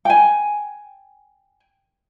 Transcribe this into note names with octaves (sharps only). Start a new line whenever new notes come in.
G5 G#5